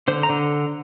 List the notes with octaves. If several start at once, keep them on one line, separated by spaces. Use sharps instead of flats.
D3 C5
A#5
D3